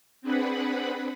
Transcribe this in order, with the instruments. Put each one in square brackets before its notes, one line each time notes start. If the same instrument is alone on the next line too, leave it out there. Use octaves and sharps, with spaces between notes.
[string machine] C4 D4 G#4 B4 F#5 B5